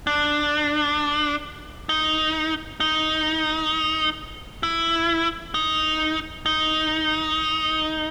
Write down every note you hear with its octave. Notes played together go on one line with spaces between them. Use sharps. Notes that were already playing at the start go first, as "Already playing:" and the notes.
D4
D#4
D#4
E4
D#4
D#4